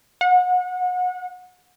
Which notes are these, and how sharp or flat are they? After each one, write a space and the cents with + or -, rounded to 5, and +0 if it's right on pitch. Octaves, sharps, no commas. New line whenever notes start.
F#5 -30